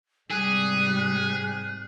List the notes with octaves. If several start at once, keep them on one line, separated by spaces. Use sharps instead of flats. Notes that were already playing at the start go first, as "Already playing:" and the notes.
G#2 C3 G3 G#3 G#4 F#6